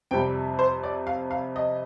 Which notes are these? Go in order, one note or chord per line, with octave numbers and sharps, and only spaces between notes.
F2 C3 G3 G5
C5
D5
F5
F5
D#5